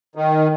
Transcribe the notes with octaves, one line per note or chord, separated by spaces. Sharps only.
D#3